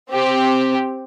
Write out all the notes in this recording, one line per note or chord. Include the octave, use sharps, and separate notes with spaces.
C4 G4